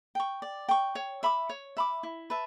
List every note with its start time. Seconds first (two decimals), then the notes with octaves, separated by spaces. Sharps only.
0.15 G5 C#6
0.42 D5
0.69 G5 C#6
0.95 C#5
1.23 E5 B5 D6
1.49 C#5
1.77 E5 B5 D6
2.03 E4
2.30 B4 E5 A5